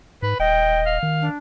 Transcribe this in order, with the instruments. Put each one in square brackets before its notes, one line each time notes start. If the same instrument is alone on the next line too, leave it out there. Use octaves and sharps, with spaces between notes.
[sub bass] G#2 [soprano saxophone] B4
[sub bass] D#1 [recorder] D#5 [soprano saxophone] G5
[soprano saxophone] F5
[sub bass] D#3
[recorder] D4